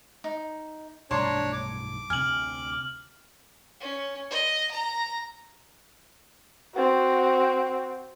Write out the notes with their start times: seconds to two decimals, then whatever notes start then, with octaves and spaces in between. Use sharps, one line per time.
0.24 D#4
1.11 B1 G2 A3 D4 C#5 A5 A#5 C6
1.53 D6
2.10 D2 C3 G#5 F6 F#7
3.81 C#4
4.31 D#5
4.71 A#5
6.74 C4 F#4